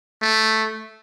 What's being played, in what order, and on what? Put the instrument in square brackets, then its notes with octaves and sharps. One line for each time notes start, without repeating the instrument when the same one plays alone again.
[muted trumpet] A3